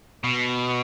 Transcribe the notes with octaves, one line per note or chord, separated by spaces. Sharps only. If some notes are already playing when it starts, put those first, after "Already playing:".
B2